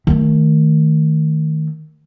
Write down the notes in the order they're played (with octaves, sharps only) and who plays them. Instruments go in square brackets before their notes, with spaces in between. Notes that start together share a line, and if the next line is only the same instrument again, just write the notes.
[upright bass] D#3 A3